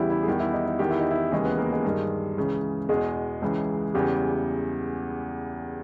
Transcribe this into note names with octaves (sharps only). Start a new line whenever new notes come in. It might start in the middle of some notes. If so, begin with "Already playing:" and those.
Already playing: E2 C#3 E3 G3 E4 G4
E4
G#4
E2 D#3 G3 G4
E4
D#4
D#4
E2 D#3 G4
E4
D#4
E4
D#2 C#3 E3 G#3 G#4
B3 B4
A#3 A#4
G#3 G#4
G2 D#3
C#2 C#3 E3
E2 B2 G#3 G#4
C#2 C#3 E3
E2 C#3 E3 G3 G4